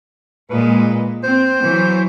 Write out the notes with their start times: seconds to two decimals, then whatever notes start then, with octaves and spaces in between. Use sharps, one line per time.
0.50 A#2 G#3 B4
1.23 C4 C5
1.60 E3 F#3